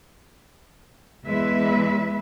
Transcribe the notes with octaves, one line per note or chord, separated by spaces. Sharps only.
E2 G#3 B4 E5